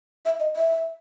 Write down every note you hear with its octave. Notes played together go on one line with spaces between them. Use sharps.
E5
D#5
E5